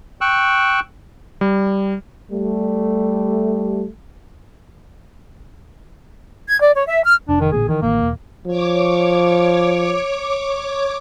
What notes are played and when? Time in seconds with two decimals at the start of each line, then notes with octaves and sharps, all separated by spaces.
0.21 G5 C#6 E6 F#6
1.41 G3
2.32 G3 A3
6.48 G#6
6.62 D5
6.74 C#5
6.87 E5
7.03 F6
7.29 F1 D4
7.40 D#3
7.52 A1 A#2 D3 G#4
7.69 D#3 E3
7.82 A1 D#3 A#3
8.01 E1
8.47 F3 C#5 D6